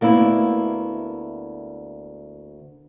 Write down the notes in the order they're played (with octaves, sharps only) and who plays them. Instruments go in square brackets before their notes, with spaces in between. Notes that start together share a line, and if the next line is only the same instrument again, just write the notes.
[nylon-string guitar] D2 A#3 B3 E4